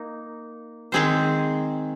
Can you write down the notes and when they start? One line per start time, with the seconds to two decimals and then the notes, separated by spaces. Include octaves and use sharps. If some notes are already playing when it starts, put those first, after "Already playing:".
Already playing: A#3 D#4
0.92 D#3 G#3 C4 G#4 C5